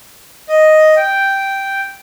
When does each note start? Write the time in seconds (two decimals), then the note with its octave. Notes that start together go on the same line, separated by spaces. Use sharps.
0.49 D#5
0.96 G5